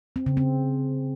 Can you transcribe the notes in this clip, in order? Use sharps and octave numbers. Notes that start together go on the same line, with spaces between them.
C4
C#3
C4